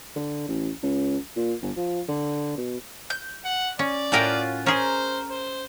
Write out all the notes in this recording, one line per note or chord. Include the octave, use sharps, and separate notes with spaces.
D3
A1
C#2
A#2
G1
F3
D3
B2
G6
F#5
C#4 D5
A2 C#4 F4 F#4 A#4 G5
C#4 G#4 A#4 C5
C5